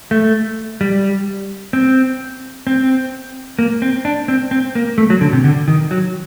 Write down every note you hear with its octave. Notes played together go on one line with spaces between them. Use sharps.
A3
G3
C4
C4
A#3
C4
D4
C4
C4
A#3
A3
F#3
D3
C3
D3
D#3
F#3